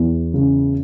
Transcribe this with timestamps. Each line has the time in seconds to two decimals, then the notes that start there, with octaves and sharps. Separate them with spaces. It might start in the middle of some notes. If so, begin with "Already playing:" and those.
Already playing: E2
0.34 C#3